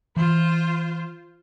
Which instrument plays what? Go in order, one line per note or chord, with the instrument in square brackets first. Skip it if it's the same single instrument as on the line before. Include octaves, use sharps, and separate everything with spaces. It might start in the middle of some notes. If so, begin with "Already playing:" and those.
[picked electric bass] E3 [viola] F4 C5